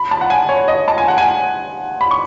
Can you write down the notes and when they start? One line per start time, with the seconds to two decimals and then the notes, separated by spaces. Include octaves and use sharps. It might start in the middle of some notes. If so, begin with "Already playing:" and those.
Already playing: B5
0.11 A5
0.21 F#5
0.30 G#5
0.49 C#5
0.68 D#5
0.88 A5
0.98 G#5
1.08 F#5
1.18 G#5
2.01 B5
2.11 C#6